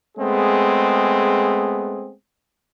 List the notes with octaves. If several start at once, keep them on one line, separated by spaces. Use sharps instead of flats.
G#3 A3 B3 C4 G#4